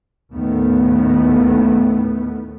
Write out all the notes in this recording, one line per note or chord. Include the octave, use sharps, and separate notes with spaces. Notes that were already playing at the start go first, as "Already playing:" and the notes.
D#2 A2 D#3 A3 B3